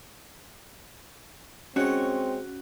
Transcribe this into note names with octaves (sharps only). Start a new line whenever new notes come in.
G#3 C4 C#4 F#4 C#5